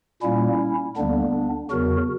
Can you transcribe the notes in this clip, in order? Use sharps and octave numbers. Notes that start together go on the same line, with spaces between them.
A#2 G3 A#3 C#4 E4
D2 D3 G3 A#3 B3 D4
E2 C#3 F#3 F#4 A#4